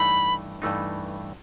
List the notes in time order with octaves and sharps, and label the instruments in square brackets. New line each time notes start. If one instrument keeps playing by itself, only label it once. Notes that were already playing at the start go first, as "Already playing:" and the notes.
Already playing: [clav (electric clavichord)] G2 E3 A3 D#4 [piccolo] B5
[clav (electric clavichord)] G2 E3 A3 D#4